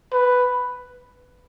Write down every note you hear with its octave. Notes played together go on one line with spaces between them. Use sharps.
B4